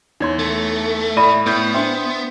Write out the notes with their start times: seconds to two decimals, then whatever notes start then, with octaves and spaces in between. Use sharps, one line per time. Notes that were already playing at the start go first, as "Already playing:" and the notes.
0.20 E2 D#4 C#5 C6 G#6
0.39 A3
1.17 A2 D5 E5 B5 D#7
1.46 A2 B3 G6
1.74 D4 C5 E5 G5 C6